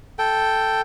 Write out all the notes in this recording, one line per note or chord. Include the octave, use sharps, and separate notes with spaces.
A4 G5